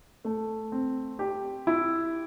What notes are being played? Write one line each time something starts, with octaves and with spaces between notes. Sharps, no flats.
A3
C4
G4
E4